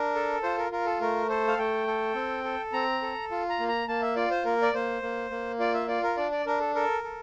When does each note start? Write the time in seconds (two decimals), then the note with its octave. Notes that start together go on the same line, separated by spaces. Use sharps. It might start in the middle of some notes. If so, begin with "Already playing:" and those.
Already playing: D4 A#4
0.15 A4
0.43 F4 C5
0.58 A#4
0.72 F4 A#4
0.86 A4
1.01 A3 A#4
1.29 A4 C5
1.48 F5
1.58 A3 G5
1.87 A4
2.15 C4
2.44 A4
2.73 C4 A#5
3.02 A4
3.31 F4
3.49 A#5
3.60 A#3
3.68 A#5
3.88 A#3 A5
4.02 E5
4.16 F4 D5
4.31 C5
4.45 A#3 A#4
4.62 D5
4.73 A#3 C5
5.02 A#3
5.31 A#3
5.59 F4 D5
5.74 E5
5.88 F4 D5
6.03 A#4
6.17 D4 D5
6.32 D5
6.46 D4 A#4
6.60 A4
6.75 A4 A#4
7.04 A4